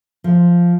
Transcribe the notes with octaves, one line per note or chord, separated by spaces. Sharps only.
F3